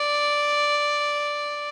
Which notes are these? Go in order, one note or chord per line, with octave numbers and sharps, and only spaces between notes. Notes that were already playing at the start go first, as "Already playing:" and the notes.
Already playing: D5